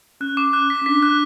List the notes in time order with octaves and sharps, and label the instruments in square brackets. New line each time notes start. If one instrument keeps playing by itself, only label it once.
[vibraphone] C#4 [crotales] F#6
[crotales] D6
F#6
B6
[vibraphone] C#4
[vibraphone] D4 [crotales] B6
[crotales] F#6